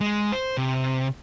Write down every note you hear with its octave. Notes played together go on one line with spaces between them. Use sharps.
G#3
C5
C3